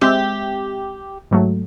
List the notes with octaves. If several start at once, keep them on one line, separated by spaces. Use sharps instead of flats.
G#3 C4 G4 E5
G#2 F#3 A3